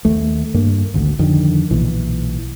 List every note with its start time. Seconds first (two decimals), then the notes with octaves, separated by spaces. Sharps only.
0.05 D#2 A3
0.54 G2 A#3
0.94 G#1 D2
1.19 F2 D3 D#3
1.71 B1 A#2 E3